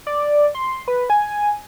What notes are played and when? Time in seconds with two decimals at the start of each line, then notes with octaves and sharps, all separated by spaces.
0.07 D5
0.55 C6
0.88 B4
1.10 G#5